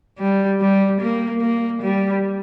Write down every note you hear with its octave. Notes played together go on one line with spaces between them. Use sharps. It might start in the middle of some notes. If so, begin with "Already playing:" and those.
G3
G3
A#3
A#3
G3